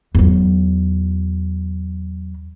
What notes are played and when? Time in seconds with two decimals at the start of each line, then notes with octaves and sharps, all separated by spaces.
0.15 E2 F#3